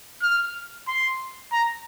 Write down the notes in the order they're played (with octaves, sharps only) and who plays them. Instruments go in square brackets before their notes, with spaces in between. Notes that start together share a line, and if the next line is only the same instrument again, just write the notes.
[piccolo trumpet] F6
C6
A#5